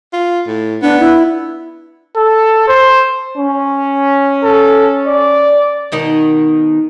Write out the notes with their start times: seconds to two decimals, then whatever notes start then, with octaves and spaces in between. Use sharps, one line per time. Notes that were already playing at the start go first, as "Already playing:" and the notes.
0.13 F4
0.47 A2
0.82 B3 D4
1.00 E4
2.16 A4
2.68 C5
3.37 C#4
4.43 A4
5.06 D5
5.92 B2 D#3 D#4